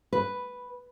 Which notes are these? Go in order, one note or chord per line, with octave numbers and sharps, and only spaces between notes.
B4